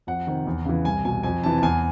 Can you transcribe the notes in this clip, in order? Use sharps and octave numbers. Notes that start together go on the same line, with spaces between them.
F2 F#5
C3 D#3
E2
C#3 E3
C2 G#5
B2 G#5
F2 G#5
C3 E3 A5
A5
E2 G#5